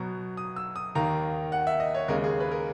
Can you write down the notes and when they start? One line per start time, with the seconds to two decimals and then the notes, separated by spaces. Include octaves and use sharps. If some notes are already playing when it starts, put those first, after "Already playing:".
Already playing: B2 F#3 B3 A#5
0.37 D#6
0.56 E6
0.76 D#6
0.95 D#2 D#3 A#3 A#5
1.52 F#5
1.67 E5
1.80 D#5
1.95 C#5
2.08 D#2 C#3 G#3 A#4
2.24 G#4
2.40 B4
2.51 A#4